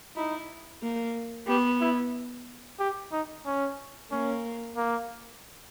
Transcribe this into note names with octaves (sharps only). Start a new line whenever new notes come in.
D#4 E4
A#3
B3 G4
E4
G4
D#4
C#4
A#3 C#4
A#3